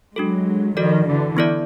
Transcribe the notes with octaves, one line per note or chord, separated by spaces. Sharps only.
F#3 G#3 D4 F#4 A4
D#3 F3 F#4 A4 D5
D3 E3
B3 E4 A4 D5